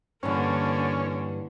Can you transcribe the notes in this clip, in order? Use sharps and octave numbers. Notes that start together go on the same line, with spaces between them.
G2 D3 E3 A#3 C#4